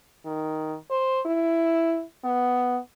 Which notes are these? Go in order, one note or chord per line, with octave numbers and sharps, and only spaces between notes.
D#3
C5
E4
B3